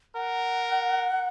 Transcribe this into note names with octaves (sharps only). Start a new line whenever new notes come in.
A#4 F#5